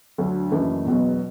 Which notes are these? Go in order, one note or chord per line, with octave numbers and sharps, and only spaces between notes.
D2 D3 F#3 A3
F#1 F#2 E3 A3
E1 E2 B2 F#3